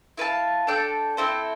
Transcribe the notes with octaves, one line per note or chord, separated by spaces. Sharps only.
E4 B4 F5 A5
D4 A4 D5 G5
C4 E4 A4 C5